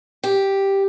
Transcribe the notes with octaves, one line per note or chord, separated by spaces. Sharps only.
G4